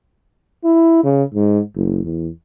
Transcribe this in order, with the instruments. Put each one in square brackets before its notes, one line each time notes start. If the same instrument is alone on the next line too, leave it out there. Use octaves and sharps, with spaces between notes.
[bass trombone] E4
C#3
G#2
F#1
E2